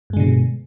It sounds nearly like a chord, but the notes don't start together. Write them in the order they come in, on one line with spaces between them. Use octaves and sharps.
G2 G#3 D3 B2